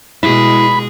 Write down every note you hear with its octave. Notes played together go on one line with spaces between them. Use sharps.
B2 G#3 E4 G#4 B5